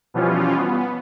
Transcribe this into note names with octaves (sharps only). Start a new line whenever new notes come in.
B2 E3 F3 G3 C#4 F4
B3